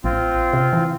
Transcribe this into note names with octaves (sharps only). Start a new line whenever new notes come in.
A1 C4 F4
C3
E3